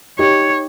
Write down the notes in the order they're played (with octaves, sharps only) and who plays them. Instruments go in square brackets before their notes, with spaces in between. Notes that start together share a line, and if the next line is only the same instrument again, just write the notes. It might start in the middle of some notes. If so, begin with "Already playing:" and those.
[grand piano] D#4 G4 [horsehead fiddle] C#5